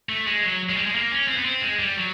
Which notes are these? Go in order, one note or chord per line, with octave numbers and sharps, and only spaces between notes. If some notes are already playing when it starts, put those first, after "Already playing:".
A3
G#3
F#3
G#3
G3
G#3
A#3
C#4
C4
B3
C4
G#3
G3
F#3